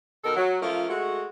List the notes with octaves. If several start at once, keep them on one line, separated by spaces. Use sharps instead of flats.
B2 D#3 A4 A#4
F#3
F3 A3 C#4 F4 A#4
G#3 A3 F#4